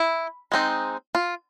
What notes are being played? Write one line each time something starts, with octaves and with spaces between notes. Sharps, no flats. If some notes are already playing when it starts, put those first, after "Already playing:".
Already playing: E4
G#3 C4 D#4
F4